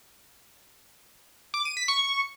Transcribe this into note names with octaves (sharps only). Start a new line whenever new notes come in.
D6
D#7
B6
C#6